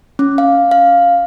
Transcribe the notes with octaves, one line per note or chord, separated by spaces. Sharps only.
C#4
F5
F5